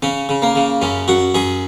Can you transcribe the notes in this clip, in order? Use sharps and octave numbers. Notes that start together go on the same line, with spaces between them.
C#3 C#4
C#3
A#3
C#3
F#2 C#4
F#2 F#4
F#2 G#4